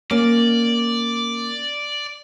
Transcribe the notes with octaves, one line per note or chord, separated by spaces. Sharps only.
A#3 C#4 D5